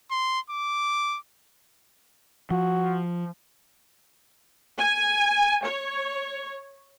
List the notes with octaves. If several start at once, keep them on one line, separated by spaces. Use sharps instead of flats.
C6
D6
F3 F#4
G#5
C#5